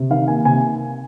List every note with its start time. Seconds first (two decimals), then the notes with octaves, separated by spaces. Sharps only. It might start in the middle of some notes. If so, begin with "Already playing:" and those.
Already playing: C3
0.10 D#3 F5
0.28 A#3 G#5
0.45 C3 G#5